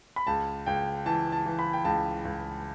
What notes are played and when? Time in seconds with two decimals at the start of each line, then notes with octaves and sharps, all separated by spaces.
0.16 B5
0.27 C#2 A5
0.66 C#2 G5
1.06 E3 A5
1.32 A5
1.46 E3
1.59 B5
1.73 G5
1.85 C#2 A5
2.25 C#2